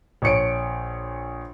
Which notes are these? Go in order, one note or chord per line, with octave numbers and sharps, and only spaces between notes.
A#1 C#5 C#7 D7